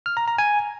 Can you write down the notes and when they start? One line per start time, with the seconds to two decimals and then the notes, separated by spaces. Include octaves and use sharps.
0.06 F6
0.17 A#5
0.28 A#5
0.38 G#5